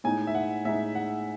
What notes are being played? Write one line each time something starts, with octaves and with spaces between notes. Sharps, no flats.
A2 G#3 D#4 G#5
E5
F#5
A2 G#3 D#4 E5
F#5